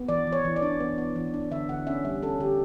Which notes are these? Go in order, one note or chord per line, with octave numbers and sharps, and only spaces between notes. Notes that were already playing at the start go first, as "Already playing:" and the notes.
Already playing: B3
E3 D5
E3
C#5
E3
D5
D4
B3
B3
E3
D4
D3 E5
D3 F#5
C#4 E5
G3 E5
C#4 A4
D3 G4